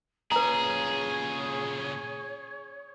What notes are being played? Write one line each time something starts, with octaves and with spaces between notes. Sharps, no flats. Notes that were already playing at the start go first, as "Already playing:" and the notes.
A#2 C#3 G#4 B4 C#5 A#5